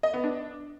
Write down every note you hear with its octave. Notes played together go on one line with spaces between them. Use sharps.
D#5
B3
D4